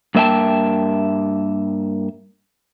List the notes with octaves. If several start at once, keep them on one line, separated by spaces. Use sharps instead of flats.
G2 A#3 E5 G5 A5